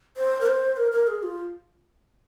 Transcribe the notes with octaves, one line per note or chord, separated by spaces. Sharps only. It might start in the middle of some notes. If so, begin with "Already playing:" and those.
C5
A#4
C5
A#4
A#4
G#4
F4